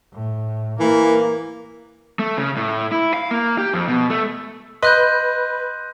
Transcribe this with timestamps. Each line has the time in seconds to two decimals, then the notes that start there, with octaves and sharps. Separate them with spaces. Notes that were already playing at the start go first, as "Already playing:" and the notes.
0.13 A2
0.80 E3 A#3
2.19 A3
2.37 C#3
2.57 A2
2.92 E4
3.14 F5
3.31 A#3
3.58 G4
3.74 F2
3.88 B2
4.10 A3
4.82 B4 D#5 C6 F#6 G6